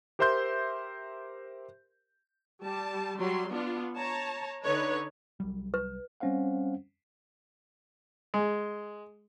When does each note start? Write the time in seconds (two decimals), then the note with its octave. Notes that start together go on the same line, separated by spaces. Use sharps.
0.19 G4 A#4 C5 E5 C6 G6
2.63 G3 A5
3.20 F#3 G3 C6
3.52 B3 D4 F4
3.96 C#5 A5 A#5
4.64 D3 D#4 B4 C#5
5.40 C2 F#3 G3
5.74 B4
6.20 G3 C4 C#4 C5 F5 F#5
8.34 G#3